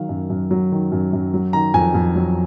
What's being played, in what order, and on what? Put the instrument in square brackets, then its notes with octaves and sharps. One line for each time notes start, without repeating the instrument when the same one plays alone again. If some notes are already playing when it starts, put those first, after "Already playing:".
Already playing: [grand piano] D#3 F#3 F5
F#2
F#2
F#3
D#3
F#2
F#2
F#3
D#3 A#5
F2 G#5
F2
F#3